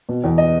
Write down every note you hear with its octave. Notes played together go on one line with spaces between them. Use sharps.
B2
E2
D#5